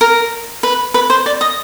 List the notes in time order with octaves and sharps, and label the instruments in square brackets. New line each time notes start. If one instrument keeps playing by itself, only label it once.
[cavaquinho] A#4
B4
B4
C5
D5
D#5